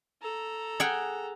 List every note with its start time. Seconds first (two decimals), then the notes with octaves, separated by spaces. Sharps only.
0.22 A4 A#5
0.80 G#4 F#5 G5